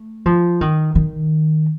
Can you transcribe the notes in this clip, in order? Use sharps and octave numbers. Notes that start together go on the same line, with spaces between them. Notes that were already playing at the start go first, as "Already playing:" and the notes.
Already playing: A3
F3
D#3
D#3